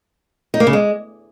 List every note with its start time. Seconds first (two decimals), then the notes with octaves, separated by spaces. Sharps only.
0.54 D#4
0.60 A#3
0.67 C#3
0.73 G#3